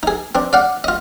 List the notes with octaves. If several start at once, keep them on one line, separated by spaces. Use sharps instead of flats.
D#4 G#4
C4 D4
D5 F5 F#5
F4 D#5